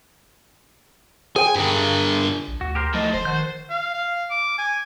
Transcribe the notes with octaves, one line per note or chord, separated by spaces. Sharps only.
G#4 C5 G5 G#5
G2 D3 G#4 A#4
A#1
D2 F#4
G4 A#4 C5
A2 F3 D#4 A5
F1 C5
D#3 F#4 F#5 G6
F5
F5
D6
G#5